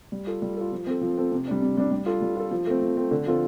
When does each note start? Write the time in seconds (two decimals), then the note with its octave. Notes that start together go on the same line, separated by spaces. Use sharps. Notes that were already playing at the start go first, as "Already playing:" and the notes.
0.12 G3
0.27 F4 A4
0.42 G3
0.57 F4 A4
0.72 F3
0.87 C4 A4
1.01 F3
1.17 C4 A4
1.32 C3
1.48 G3 D4
1.62 C3
1.77 G3 D4
1.91 G3
2.06 F4 A4
2.22 G3
2.36 F4 A4
2.51 F3
2.67 A3 C4
2.82 F3
2.97 A3 C4
3.11 D3
3.26 F3 C4 F4 A4